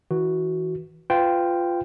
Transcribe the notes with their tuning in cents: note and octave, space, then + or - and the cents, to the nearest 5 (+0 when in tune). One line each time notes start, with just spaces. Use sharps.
E3 -30 F#4 +0
F4 -5 B4 +35 G5 +0